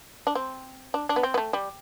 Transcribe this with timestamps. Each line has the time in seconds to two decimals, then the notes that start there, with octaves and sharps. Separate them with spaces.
0.27 D4
0.35 C4
0.94 D4
1.09 D4
1.16 B3
1.23 C4
1.34 B3
1.38 A3
1.53 G3